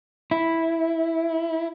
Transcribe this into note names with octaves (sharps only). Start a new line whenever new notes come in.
E4